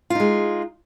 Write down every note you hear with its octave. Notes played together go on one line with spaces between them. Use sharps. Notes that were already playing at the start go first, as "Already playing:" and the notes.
G#3 D#4 F4